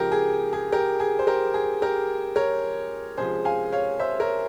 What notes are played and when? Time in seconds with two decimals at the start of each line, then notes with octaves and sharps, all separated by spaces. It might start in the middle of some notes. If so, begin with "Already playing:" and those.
Already playing: C#2 C#3 F3 G4 A#4
0.12 G#4
0.53 G#4
0.72 G4 A#4
1.00 G#4
1.19 C5
1.27 G4 A#4
1.54 G#4
1.82 G4 A#4
2.36 A#4 C#5
3.18 C#2 C3 F3 G#4 C5
3.45 F5 G#5
3.72 C#5 F5
4.00 C5 E5
4.20 A#4 C#5